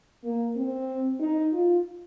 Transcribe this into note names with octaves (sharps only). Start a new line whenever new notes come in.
A#3
C4
D#4
F4